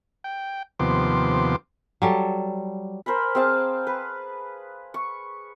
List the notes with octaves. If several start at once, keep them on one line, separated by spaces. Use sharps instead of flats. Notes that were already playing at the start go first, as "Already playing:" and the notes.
G5
D#2 C3 F3 B3 C6 D6
F#3 G3 A4
A#4 C5 G#5 B5
C4 G#4 F5 A5
B4
C#6